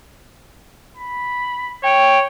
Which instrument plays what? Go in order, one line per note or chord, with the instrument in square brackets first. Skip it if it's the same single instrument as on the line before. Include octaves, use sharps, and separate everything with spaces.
[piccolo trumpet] B5
[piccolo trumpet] C#5 [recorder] G5